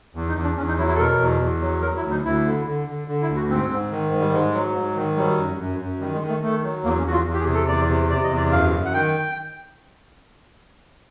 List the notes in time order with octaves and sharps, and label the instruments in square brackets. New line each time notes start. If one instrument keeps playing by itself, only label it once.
[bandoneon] E2
D#4
E2
D4
E2 C#4
D#4
F#3 E4
E4
A4
B2 A#4
E2
E2
F#3
F#3 A#4
E4
D2
D#4
D2 E4
D3
D3
D3
D3
E4
D2
F#4
G#2 C4
G#2
D#3
G#2
G3
G#2 G#3
F#3
G#2
D#3
F#3 G3
F#2
F#2
F#2
D#3 G3
G#3
D#3
A3
D#3 A3
F#3
E2 A#3
C#4
E2 F#4
F4
E2
G4
G#4
C3
A4
E2 D5
C3
C3 D5
D#5
E2
D5
F#2 F5
F#2
F#5
D#3 G5